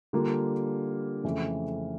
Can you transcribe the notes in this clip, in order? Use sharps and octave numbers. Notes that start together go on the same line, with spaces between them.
D3 G3 A#3 D4 F4
F2 C#3 E3 A3